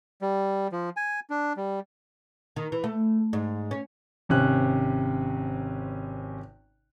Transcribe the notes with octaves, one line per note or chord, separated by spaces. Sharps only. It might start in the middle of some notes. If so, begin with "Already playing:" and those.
G3
F3
G#5
D4
G3
D#3
E3
A3
G#2
C#4
G#1 C3 C#4 F#6